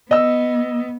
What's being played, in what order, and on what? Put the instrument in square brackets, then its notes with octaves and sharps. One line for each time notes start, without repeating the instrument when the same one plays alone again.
[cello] B3 [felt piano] D#5 E6